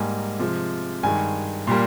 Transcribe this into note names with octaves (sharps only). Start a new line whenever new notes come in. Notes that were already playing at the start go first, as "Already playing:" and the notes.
Already playing: G#2 G3 A#3 G#5
C3 F3 G#3
G2 D#3 G#3 G#5
A#2 G3 A#3 C6